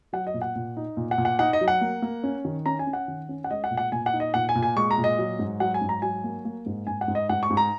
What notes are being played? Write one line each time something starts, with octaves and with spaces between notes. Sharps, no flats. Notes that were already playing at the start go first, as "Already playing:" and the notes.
F#3 F#5
D#5
A#2
F#5
A#2
D#4
A#2
F#5
A#2
F#5
D#4 F#5
D#5
F#3
F#5
A#3
A#3
C#4
D#3
C#4 A#5
G#5
C#4
F#5
D#3
C#4
F#5
G#3 D#5
F#5
A#2
F#5
A#2 G#5
F#5
D#4
D#5
A#2 F#5
G#5
A#2
G#5
G#3 C#6
A#5
A#2
D#5
F#3
G#2
F#3 F#5
G#5
G#2
A#5
F#3 G#5
A#3
A#3
G#2
G#2 G#5
F#5
G#2
D#5
G#2 F#5
C#6
G#2
A#5